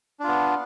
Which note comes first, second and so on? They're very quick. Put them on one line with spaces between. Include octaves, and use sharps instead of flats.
D4 F4 B3